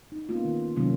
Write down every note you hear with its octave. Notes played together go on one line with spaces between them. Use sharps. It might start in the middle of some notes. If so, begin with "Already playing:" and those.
D#4
A#3 B3 C#4 F4
D#3
C3 D#3 F#3 G3 A#3 C#4